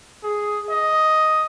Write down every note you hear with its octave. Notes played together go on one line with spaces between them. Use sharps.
G#4
D#5